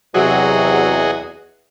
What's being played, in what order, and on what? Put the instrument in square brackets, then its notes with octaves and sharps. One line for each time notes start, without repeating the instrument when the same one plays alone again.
[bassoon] E2 [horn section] C3 F#3 [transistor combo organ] F#4 G#4 D#5